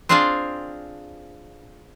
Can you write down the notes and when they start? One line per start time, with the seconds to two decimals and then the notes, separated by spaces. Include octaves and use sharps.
0.09 C4 D4 F4 G#4 C5 F5